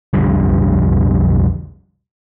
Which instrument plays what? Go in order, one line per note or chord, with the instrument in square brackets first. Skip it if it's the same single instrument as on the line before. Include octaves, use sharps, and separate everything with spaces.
[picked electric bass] B1 F2 D3 G3